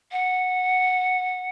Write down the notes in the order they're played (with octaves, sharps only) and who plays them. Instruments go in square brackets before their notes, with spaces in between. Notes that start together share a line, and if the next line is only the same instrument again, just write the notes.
[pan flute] F#5